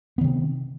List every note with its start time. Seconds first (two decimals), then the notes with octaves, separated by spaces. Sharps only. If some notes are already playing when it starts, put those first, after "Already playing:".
0.18 B3
0.21 D#3
0.24 C3
0.27 C4